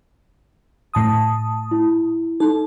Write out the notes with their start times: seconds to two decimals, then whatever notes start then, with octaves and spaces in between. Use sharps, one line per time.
0.94 A2 A5 D#6
1.71 E4
2.40 D#4 A4